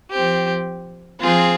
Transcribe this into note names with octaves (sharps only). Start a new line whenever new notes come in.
F3 C4 G4
F3 C4 F4 G#4